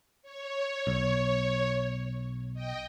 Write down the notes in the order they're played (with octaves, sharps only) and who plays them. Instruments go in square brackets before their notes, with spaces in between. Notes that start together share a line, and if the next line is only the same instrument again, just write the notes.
[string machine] C#5
[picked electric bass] B1
[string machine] D#5 G5